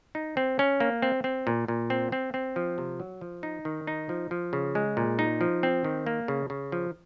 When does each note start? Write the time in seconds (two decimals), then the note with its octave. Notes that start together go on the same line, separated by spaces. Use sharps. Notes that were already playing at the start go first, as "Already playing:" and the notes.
0.15 D#4
0.37 C4
0.59 C#4
0.80 A#3
1.02 C4
1.24 C4
1.47 A#2
1.68 A#2
1.90 C4
2.12 C4
2.34 C4
2.56 F3
2.78 C3
3.00 F#3
3.21 F3
3.43 D#4
3.65 D#3
3.87 D#4
4.09 F3
4.31 F3
4.53 C#3
4.75 G#3
4.97 A#2
5.19 D#4
5.41 F3
5.63 C4
5.84 D#3
6.06 A#3
6.28 C#3
6.50 C#3
6.72 F3